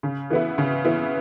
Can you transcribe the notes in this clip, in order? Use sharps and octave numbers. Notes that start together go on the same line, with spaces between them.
C#3
E3 B3 E4
C#3
E3 B3 E4